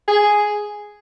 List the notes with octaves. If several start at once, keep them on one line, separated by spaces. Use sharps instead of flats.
G#4